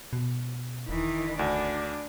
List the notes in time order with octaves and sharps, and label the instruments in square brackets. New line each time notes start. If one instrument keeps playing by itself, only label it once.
[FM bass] B2
[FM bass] E1 [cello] D#3 E3
[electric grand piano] D2 [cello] D4